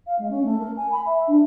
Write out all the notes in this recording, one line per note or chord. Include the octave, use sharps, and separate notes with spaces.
F5
G#3
C#4
A3
A#4
G#5
B5
E5
D4